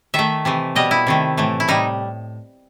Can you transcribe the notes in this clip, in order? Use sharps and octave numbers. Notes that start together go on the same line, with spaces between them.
D#3 A3 E5
C3 E3 A3
B2 G3 D#5
E4
C3 D#3 A3
A2 E3 A3
E4
A2 G3 D#4